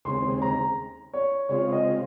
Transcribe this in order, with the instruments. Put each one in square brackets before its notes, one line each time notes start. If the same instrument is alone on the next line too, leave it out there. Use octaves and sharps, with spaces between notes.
[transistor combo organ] D#2 C#3 G#3 C4 [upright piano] C6
[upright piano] A#5
C#5
[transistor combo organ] C#3 G#3 C4 F4 [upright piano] C#5
[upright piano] D#5